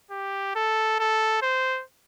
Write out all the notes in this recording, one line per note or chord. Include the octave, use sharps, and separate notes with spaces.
G4
A4
A4
C5